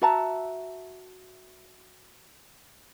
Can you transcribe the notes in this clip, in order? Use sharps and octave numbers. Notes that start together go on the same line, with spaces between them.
F#4 E5 A5 A#5